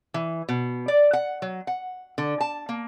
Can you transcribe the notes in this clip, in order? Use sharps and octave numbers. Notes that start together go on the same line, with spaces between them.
E3
B2
D5
F#5
F#3
F#5
D3
A5
A#3